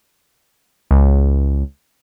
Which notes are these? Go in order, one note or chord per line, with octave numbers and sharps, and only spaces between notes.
C#2